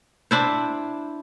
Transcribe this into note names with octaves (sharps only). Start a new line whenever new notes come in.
D4 E4 C5